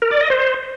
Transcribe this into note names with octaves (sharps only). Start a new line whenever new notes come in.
A#4
D5
D#5
C5